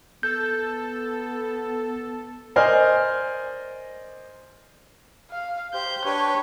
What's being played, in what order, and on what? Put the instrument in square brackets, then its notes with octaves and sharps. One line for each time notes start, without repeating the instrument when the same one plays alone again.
[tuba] B3 [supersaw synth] A4 [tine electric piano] G6
[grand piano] A#4 C5 D5 D#5 G#5 F6
[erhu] F5
[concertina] G4 C5 [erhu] G6
[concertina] D4 G4 B4 [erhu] C#5